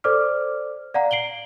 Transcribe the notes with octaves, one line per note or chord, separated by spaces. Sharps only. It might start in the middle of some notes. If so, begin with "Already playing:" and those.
A4 C5 D5 D6 F6
D5 F5 F#5 A#5
C7 D7 F#7 G7